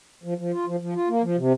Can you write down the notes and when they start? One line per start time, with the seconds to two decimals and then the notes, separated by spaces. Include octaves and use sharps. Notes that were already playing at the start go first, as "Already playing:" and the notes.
0.24 F3
0.38 F3
0.52 F4
0.66 F3
0.80 F3
0.95 F4
1.09 A#3
1.23 F3
1.37 C3